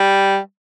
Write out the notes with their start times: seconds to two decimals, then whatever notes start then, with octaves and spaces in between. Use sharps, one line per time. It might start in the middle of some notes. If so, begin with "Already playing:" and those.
Already playing: G3